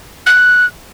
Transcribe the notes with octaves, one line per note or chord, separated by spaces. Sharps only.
F#6